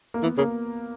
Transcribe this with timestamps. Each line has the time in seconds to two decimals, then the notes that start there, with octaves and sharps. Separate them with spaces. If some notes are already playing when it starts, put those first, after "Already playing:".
0.14 A#3
0.23 E3 B3
0.38 C#3 A#3